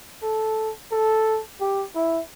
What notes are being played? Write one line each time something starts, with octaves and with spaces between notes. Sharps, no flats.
A4
A4
G4
E4